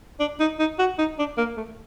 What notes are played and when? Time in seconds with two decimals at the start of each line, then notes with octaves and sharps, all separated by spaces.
0.20 D4
0.40 D#4
0.59 D#4
0.79 F#4
0.99 D#4
1.19 D4
1.38 A#3
1.57 A3